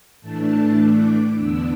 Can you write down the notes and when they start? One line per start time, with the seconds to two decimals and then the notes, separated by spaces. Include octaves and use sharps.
0.21 A2 E3 A3 D4 A5
0.79 D6
1.37 E2 D3 B3 D4 E6